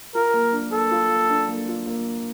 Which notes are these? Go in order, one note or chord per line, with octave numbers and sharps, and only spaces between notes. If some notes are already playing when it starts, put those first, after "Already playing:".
F4 A#4
A#3
D4
A#3 A4
F4
A#3
D4
A#3
F4
A#3